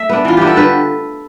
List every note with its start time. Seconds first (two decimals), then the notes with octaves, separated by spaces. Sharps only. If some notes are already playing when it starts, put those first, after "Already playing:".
Already playing: A3 E5
0.09 B3 D4
0.25 E3 F4
0.37 B3 D4 G4
0.47 A4
0.56 D3 B4